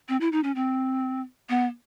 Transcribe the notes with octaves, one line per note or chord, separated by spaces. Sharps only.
C4
E4
D#4
C#4
C4
B3